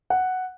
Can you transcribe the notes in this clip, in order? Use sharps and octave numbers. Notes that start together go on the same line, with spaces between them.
F#5